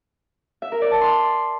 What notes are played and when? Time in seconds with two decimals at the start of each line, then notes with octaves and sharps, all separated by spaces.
0.62 E5
0.72 A#4
0.82 D5
0.91 A5
1.01 C6